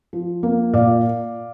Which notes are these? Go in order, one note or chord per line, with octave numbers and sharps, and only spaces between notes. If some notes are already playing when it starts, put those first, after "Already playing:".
F3
A#3
A#2 D5 F5